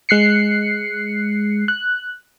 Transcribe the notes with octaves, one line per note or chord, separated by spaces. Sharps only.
G#3 F#6 C7 C#7
F#6